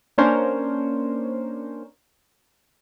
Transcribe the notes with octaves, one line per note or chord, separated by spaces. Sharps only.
A#3 C#4 D4 A#4 C5 C#5